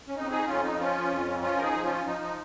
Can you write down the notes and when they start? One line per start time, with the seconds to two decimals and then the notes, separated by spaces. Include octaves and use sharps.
0.08 C#4
0.15 F2 D#4
0.31 D#4 G#4
0.46 F2 C#4 F4
0.63 D#4
0.78 F3 C#4 F4
1.10 F2
1.41 F3 C#4 F4
1.57 A#4
1.63 D#4 G#4
1.73 F3
1.83 C#4 F4
2.05 F3 D#4
2.21 D#4